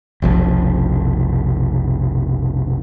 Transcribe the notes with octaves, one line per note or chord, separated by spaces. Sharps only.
F1 B1 F3